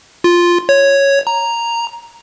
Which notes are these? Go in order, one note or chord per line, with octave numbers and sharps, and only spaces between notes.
F4
C#5
A#5